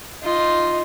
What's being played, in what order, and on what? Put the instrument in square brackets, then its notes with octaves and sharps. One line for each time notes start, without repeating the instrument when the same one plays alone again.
[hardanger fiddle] D#4 F4